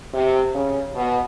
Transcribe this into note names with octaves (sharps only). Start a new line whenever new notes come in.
C3
C#3
B2